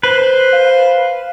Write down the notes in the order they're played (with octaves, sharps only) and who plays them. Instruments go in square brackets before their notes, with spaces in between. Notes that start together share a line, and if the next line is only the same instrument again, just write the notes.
[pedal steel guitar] B4 [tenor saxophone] C5
[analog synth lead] F5